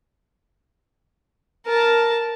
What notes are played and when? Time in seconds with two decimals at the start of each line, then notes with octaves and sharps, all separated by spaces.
1.66 A#4 A5